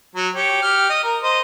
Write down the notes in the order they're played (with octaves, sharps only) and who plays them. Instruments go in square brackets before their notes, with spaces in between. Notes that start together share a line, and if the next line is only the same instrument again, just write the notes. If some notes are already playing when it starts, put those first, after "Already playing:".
[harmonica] F#3
G4 C#5
G4 F6
D#5
A#4
C5 D#5